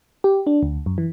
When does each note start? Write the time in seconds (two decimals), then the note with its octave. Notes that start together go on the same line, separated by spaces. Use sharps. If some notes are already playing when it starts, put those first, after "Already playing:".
0.24 G4
0.47 D4
0.63 D2
0.86 F#2
0.98 E3